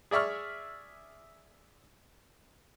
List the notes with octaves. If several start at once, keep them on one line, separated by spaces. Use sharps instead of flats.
G#4 D5 E5 C#6 F6